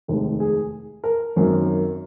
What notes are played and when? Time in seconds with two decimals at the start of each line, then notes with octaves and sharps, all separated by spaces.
0.08 F1 D#2 D#3 G#3
0.40 G#4
1.04 A#4
1.36 G#1 F#2 D#3 A#3 C#4